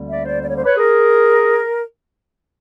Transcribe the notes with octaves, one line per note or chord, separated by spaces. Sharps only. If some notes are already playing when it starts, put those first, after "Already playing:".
Already playing: D2 D3 G3 A#3 C#4
D5 E5
C5 D5
D5
C#5
C5
B4 C#5
G#4 A#4